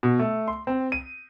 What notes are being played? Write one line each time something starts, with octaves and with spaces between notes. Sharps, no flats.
B2
A3
C6
C4
D#7